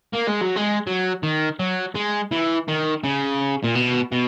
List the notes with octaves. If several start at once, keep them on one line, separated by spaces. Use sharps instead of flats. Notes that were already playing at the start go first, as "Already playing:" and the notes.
A#3
G#3
F#3
G#3
F#3
D#3
F#3
G#3
E3
D#3
C#3
A#2
B2
B2